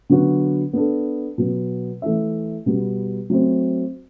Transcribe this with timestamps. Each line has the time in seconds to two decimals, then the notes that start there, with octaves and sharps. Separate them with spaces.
0.09 D3 F#3 B3 F#4
0.73 B3 D4 A4
1.38 B2 F#3 B3
2.02 E3 A3 E4 A4 E5
2.66 B2 G3 B3
3.30 F#3 A3 C4